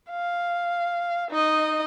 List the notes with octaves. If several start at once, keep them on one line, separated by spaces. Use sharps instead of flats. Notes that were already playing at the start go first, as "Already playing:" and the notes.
F5
D#4 D#5